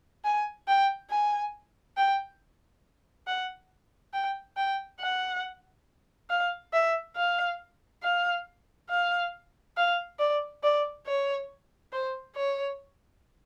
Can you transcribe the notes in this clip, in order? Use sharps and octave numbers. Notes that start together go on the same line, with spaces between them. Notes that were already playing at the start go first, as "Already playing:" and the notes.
G#5
G5
G#5
G5
F#5
G5
G5
F#5
F5
E5
F5
F5
F5
F5
D5
D5
C#5
C5
C#5